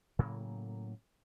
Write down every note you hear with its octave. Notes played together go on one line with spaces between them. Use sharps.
A2 C#3 F#3 A#3